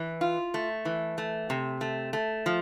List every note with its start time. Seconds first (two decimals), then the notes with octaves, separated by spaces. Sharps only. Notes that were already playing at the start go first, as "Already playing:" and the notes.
Already playing: E3
0.21 F4
0.54 A3
0.85 E3
1.18 A3
1.50 C3
1.81 A3
2.13 A3
2.46 F3